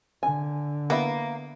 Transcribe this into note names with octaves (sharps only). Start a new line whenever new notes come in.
D3 G#5
A#3 B3 E4